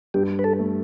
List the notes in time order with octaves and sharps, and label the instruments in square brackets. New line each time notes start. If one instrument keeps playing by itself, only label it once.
[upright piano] G2 [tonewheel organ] G4
[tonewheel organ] B4
A4
[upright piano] A3